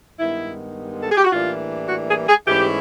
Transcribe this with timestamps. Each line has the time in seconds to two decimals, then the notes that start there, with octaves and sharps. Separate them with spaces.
0.18 G2 D#3 G#3 B3 E4
1.02 A4
1.10 G#4
1.17 G4
1.24 F#4
1.32 A2 E3 G3 A#3 D4 F4
1.89 F#4
2.09 G#4
2.28 G#4
2.47 G#2 E3 A3 C#4 E4 G4